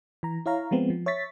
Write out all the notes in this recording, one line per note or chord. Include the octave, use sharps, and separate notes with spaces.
E3 A#5
E4 C#5 F5 A#5
F3 G#3 B3 C4
F3
C#5 E5 C#6 A6 B6